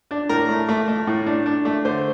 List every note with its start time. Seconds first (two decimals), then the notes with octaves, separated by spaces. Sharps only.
0.11 D4
0.29 A2 A#4
0.49 A3
0.69 A3
0.88 A3
1.07 A2
1.26 D4
1.46 D4
1.65 A3
1.85 D3 C5